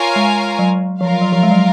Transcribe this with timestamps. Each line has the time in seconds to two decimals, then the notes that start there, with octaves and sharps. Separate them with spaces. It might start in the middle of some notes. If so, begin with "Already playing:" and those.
Already playing: F4 A#4 C#5 F5 G#5
0.16 G#3
0.59 F#3
1.01 F3 F4 A#4 F5
1.11 F#3
1.21 F#3
1.32 F3
1.43 G#3
1.51 F#3